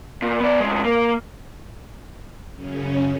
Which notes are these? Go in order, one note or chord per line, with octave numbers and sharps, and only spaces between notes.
A#2
B3 D5
D2 G#3
A#3
F#2 C#3 C#4